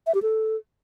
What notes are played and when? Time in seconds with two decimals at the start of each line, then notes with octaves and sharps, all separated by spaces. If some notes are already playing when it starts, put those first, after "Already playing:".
0.07 E5
0.15 G4
0.22 A4